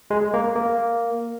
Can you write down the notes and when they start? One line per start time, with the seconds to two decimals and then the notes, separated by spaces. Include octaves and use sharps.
0.11 G#3
0.34 A#3
0.56 A#3